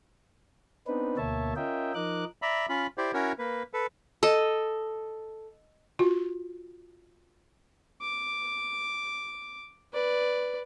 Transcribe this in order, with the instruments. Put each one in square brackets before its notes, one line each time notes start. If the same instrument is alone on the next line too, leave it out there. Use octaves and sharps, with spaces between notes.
[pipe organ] B3 C4 D4 D#4 B4
D2 B2 A#3 C#5 E5 A5
C#4 F4 A#4 D#5 E5 G5
F3 D#4 A#4 D#5 D6 F#6
[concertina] D5 E5 A#5 B5
C#4 F4 B5
E4 G4 C5 D5
C#4 E4 F#4 A#4 C#5
A#3 B4
A4 B4
[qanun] A4 D#5
[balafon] F4 F#4
[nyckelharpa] D6
B4 D5